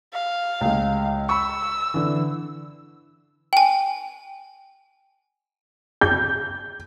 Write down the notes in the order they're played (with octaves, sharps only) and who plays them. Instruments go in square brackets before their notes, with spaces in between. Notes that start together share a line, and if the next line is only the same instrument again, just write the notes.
[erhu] F5
[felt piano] C#2 G#3
[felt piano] B5 C#6 [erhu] E6
[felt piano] D3 E3
[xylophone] G5 G#5
[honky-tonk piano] G6